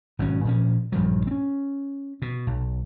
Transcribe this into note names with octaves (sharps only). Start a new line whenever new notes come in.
G#1 B2 F#3 C#4
A#2 F3 C#4
A#1 G2 F3 F#3
C4 C#4
B2
B1